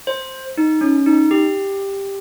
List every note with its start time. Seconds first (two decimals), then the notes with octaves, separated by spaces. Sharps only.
0.07 C5
0.57 D#4
0.81 C#4
1.06 D#4
1.31 G4